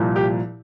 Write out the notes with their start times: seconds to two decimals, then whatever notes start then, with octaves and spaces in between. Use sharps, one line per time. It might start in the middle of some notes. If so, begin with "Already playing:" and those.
Already playing: C2 A#2 F3
0.16 G4